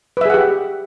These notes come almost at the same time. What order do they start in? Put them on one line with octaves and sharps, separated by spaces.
B4 E5 G#4 F#5 G4